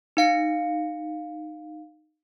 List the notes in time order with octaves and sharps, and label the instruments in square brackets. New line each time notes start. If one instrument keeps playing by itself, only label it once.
[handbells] D#4 F5 C#7